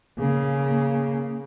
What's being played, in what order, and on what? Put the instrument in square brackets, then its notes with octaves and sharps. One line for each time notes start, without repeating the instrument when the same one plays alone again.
[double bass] C#3 A#3